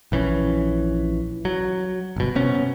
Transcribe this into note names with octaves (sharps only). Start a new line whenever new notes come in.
A#1 E3 C4 C#4
F#3
G1 B2
C3 B3 C#4